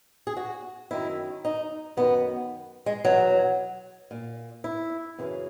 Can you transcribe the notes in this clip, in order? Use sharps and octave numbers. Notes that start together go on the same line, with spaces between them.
G#4
F#4
F#2 D#3 E4
D#4
F#2 D#3 B3
G#3
E2 B2 F#3
A#2
E4
F#2 C#3 E3